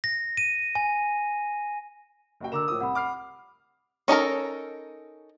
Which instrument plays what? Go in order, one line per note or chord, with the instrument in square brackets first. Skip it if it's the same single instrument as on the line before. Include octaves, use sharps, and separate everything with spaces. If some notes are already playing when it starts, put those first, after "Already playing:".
[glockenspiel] A#6
D#7
G#5
[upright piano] F#1 F#4 G5
[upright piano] D3 A#5 E7 [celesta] A#4 D6 E6
[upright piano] A2 F3 D#6
[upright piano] C2 [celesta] F#5 B5
[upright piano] D6 F6 C7
[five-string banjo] C#4 D#4 A4 A#4